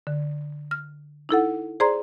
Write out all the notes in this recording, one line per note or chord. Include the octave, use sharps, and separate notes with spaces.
D3
F6
D#4 E4 A4 F#5
G#4 C5 D5 A#5 C6